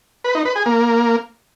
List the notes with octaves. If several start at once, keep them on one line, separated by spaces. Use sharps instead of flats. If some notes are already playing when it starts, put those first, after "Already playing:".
B4
D#4
B4
G#4
A#3